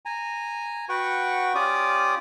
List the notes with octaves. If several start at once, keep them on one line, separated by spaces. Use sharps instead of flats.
G#5 A#5
F#4 B4 F#5 G5 C#6
C#4 F4 G4 D5 D6 D#6